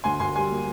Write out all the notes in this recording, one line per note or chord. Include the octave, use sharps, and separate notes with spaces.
D2 G#5 C6
D2 G#5 C6
G3 G#5 C6
A#3